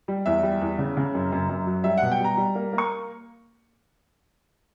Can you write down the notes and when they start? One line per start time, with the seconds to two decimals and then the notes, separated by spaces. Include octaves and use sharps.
0.08 G3
0.26 E2 E5
0.43 G3
0.61 E2
0.78 C#3
0.97 C#3
1.14 F#2
1.32 F#2
1.49 F#2
1.67 F#3
1.84 G3 E5
1.98 B2 F#5
2.11 G5
2.20 G3 A#5
2.37 G3
2.55 A#3
2.73 A#3
2.78 C#6